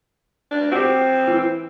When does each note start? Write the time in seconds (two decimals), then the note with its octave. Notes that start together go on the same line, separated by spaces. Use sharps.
0.51 D4
0.72 C4 F#4 G4
1.28 E3